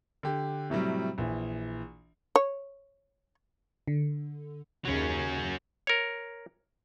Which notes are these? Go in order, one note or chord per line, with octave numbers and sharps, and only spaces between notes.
D3 G4
A2 C3 F#3 G3
A#1 E3
C#5
D3
D#2 C#3 F#3 C#4
A#4 C#5